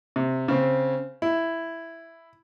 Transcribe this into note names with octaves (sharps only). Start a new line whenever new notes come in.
C3
C#3 C4
E4